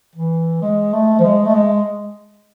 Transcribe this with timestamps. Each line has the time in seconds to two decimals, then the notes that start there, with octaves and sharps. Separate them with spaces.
0.16 E3
0.62 G#3
0.93 A3
1.19 F3
1.24 G#3
1.45 A3
1.54 G#3